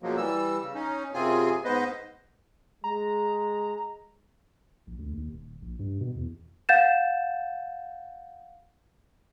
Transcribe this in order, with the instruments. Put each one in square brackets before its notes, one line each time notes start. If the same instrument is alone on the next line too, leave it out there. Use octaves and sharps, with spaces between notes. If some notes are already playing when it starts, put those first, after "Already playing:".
[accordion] F#2 B2 F3 F#3 G#3 A#3
E3 G3 E6
C#3
C#4 D#4
F#2 C3 C4 F4 G#4 G#5
G#2 B3 B4 C5 D#5
[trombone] G#3 [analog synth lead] A#5
[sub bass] A#1
D2
D#2
D#1
A#1
G2
B2
E2
[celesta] F5 F#5 G6 A6 E7